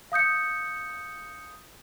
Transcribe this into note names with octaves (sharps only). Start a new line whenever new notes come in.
F5 D#6 G6 C#7